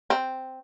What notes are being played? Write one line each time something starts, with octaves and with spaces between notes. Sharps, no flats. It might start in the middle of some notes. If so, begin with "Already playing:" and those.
C4